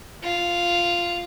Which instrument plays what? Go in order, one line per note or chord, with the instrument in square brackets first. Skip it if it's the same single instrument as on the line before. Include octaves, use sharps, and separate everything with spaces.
[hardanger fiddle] F4